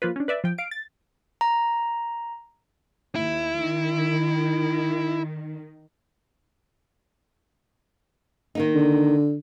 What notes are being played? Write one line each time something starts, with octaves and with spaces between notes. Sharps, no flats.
F3 A#3 F4 B4
C#4 D4
B4 D5 E5
F3 G5
F5 D7
A6
A#5
D#2 E4
D#3
D#3 A#3 D#4
D3